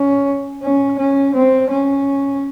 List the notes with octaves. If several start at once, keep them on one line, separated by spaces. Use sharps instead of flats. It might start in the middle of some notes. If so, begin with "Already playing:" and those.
Already playing: C#4
C#4
C#4
C4
C#4